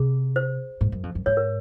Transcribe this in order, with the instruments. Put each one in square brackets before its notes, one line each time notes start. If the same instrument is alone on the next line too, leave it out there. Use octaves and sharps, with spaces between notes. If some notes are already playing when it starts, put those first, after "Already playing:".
Already playing: [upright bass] C3 [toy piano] G#4
[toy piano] C5
[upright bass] G#2
F#2
F2
F#2
[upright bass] G#2 [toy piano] C#5
[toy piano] A#4